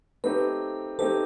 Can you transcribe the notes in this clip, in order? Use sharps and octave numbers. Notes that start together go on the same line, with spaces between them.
A3 C4 D#4 G4 B4 C5
A3 C4 D#4 G4 A4 C5